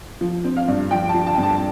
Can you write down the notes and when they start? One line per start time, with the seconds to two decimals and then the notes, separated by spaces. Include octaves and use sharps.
0.21 F3
0.44 C4
0.57 F5
0.68 G2
0.91 F3 G5
1.09 A5
1.14 F3
1.27 A5
1.35 G2 G5
1.43 A5